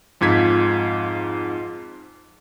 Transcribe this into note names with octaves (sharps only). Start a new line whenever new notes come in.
F2 G#2 F4 G#6 B6